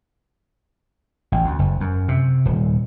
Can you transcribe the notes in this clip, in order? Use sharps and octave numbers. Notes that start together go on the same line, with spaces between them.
A1
D2
F#1
F#2
C3
D#1